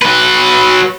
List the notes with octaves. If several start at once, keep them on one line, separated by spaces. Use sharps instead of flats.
F#3 B4